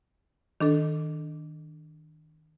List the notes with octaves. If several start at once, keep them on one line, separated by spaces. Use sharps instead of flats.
D#3 D4 A4